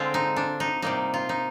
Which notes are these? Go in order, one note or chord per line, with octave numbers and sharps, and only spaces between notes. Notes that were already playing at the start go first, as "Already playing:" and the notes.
Already playing: D3 G#3 C4 F4
D#4
D4
D#4
C3 G3 A#3 D#4
F4
D#4